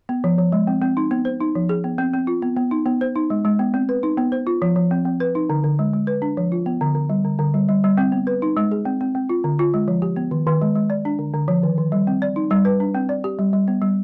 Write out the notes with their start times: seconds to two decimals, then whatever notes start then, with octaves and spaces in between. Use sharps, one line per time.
0.09 B3
0.24 F3
0.39 F3
0.52 G#3
0.67 C4
0.82 C4
0.97 D#4
1.11 B3
1.25 C5
1.41 D#4
1.55 F3
1.69 G#4
1.84 B3
1.98 C4
2.13 C4
2.27 F4
2.42 B3
2.57 B3
2.71 D#4
2.86 B3
3.01 C5
3.15 D#4
3.30 G#3
3.45 G#3
3.59 B3
3.74 C4
3.89 B4
4.03 D#4
4.18 B3
4.32 C5
4.47 F4
4.62 F3
4.76 F3
4.91 C4
5.05 C4
5.20 B4
5.35 D#4
5.50 D3
5.64 D3
5.79 G#3
5.93 G#3
6.07 B4
6.22 D4
6.37 F3
6.52 F4
6.66 B3
6.81 D3
6.95 D3
7.10 G3
7.25 D3
7.39 D3
7.54 G3
7.69 G3
7.84 G3
7.98 C4
8.12 B3
8.27 B4
8.42 D#4
8.57 G#3
8.71 G#4
8.85 C4
9.01 C4
9.15 C4
9.29 F4
9.44 D3
9.59 F4
9.74 G#3
9.88 F3
10.02 G4
10.16 B3
10.31 D#3
10.47 D#3
10.61 G#3
10.75 G#3
10.90 D5
11.05 D4
11.19 D3
11.34 D3
11.48 F3
11.63 D#3
11.78 D#3
11.92 G3
12.07 C4
12.22 D5
12.36 D#4
12.51 G3
12.65 B4
12.80 D4
12.95 C4
13.09 D5
13.24 G4
13.39 G3
13.53 G3
13.68 B3
13.82 G3